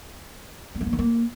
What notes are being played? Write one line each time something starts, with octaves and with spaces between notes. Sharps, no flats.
A#3
A3
A#3
D#3
A#3